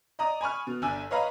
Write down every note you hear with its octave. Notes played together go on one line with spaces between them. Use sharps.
D5 D#5 A#5 D#6
G#5 B5 C#6 F6
B2
G1 D4 G#5 E6
B4 C#5 D#5 F5 A#5 B5